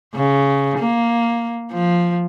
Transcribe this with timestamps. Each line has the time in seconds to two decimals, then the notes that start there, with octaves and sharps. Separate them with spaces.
0.15 C#3
0.79 A#3
1.72 F3